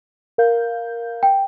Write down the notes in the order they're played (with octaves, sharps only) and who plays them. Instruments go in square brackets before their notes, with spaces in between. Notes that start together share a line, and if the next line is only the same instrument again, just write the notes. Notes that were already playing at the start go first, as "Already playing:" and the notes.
[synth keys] A#4 F5 G6
[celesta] G5